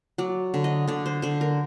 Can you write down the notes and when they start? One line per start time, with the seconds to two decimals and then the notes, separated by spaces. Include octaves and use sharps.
0.18 F#3 D5
0.54 D3
0.64 D#5
0.88 D3 D5
1.06 C5
1.22 D3 C5
1.41 A#4